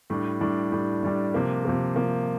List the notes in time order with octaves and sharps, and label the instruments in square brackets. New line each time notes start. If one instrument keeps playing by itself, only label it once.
[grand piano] A2 G3 D4
A2 G3 D4
A2 G3 D4
A2 G3 D4
C3 F3 A#3
C3 F3 A#3
C3 F3 A#3